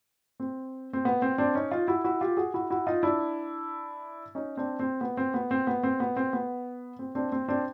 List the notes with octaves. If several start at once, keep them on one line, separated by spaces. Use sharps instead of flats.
C4
C4
B3
C4
C4 D4
C#4 D#4
D#4 F4
E4 F#4
E4 F#4
F4 G4
F#4 G#4
E4 F#4
E4 F#4
D#4 F4
D4 E4
C#4 D#4
C4 D4
C4
B3
C4
B3
C4
B3
C4
B3
C4
B3
C4
C4 D4
C4
C4 D4